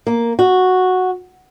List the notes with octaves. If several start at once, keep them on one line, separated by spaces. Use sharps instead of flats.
A#3
F#4